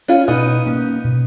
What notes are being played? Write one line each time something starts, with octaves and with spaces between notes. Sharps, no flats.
C#4 F4
B2 B3 D#4
A#3 C#4
B2